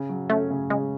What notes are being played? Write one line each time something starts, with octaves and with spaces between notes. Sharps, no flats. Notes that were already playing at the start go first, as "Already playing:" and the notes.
Already playing: C#3
F#3
A3 C#4
C#3
C#3 G#3